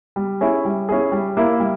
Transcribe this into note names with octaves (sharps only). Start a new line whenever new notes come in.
G3
C#4 E4 G#4
G3
C#4 E4 G#4
G3
A#3 E4
G3